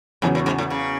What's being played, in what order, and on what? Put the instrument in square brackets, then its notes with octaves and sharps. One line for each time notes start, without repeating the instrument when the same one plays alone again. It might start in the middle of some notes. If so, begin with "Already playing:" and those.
[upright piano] E2 C#3 F#3 [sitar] G#2
[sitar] F#2
G#2
A2
C#3